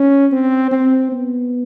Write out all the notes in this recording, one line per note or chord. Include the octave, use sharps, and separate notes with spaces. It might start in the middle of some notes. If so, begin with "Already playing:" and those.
Already playing: C#4
C4
C4
B3